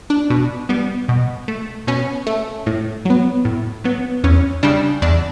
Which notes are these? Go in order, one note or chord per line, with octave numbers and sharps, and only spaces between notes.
D4
B2
G3 B3
B2
A3
B2 C#4
A3
A2
F#3 B3
A2
F#3 B3
E2 C#4
C#3 G3 D4
E2 D4